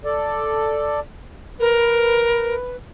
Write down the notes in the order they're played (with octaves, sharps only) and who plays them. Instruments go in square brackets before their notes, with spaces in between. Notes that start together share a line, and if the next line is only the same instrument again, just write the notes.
[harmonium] A4 D5
[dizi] A#4 [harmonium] B4